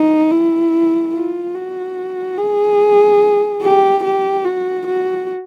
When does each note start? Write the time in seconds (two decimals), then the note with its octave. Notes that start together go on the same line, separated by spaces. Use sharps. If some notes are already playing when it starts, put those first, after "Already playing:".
Already playing: D#4
0.31 E4
1.13 F4
1.54 F#4
2.38 G#4
3.62 G4
4.04 G4
4.45 F#4
4.87 F#4